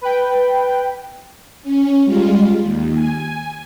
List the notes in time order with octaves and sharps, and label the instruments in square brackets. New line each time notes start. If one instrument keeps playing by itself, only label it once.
[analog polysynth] B4 G5
[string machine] C#4
G3 G#3 F4
D#2
G#5